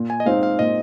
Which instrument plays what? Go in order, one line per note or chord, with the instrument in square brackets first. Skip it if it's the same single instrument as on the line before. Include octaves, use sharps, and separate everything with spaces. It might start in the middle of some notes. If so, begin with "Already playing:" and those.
Already playing: [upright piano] A#2
[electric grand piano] G#5
D#5
[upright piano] G#3 C4 D#4 [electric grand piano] F5
[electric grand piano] F5
[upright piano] A#2 [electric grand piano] D#5